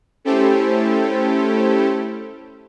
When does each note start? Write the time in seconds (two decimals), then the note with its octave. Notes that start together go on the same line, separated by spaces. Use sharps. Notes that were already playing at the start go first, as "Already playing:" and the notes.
0.25 A3 C#4 E4 G4 A4 C5